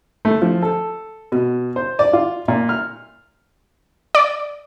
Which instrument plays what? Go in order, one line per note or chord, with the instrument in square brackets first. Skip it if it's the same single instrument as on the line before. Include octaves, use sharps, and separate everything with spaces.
[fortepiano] A3
F3
A4
B2
C5
D5
F4
A#2
F6
[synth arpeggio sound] D5